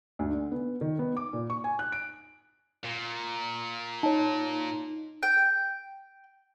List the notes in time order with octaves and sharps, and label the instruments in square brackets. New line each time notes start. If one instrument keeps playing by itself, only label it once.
[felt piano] D2
D3
B3
D#3
B3
D6
A#2
C#6
G#5
F#6
D7
[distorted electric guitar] A#2
[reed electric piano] D#4 [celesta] C#5 A5
[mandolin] G5